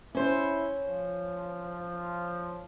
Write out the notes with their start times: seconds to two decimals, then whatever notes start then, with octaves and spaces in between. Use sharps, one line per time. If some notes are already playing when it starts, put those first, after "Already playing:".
0.15 C#4 E4 C5
0.85 F3